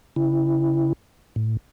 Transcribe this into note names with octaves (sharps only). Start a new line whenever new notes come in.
C#3 E4
A2